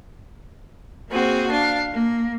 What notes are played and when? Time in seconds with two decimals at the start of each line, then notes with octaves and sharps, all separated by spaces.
1.10 A#3 C4 F#4 G#4
1.50 D4 F5
1.93 A#3